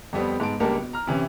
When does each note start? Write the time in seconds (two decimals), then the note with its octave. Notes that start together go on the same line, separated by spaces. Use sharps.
0.13 F2 G3 B3 C4
0.40 G#2 B3 A5 D7
0.60 C#2 G3 A#3 D4 A#4 A5
0.76 B2
0.93 A#5 F6
1.07 C3 E3 C#4 E4